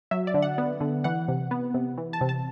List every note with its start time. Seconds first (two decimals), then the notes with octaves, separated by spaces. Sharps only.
0.11 F#3 E5
0.27 D5
0.34 D3
0.42 F#5
0.58 B3
0.81 D3
1.04 E3 F#5
1.28 C3
1.51 B3
1.74 C3
1.98 E3
2.13 A5
2.21 C3
2.29 A5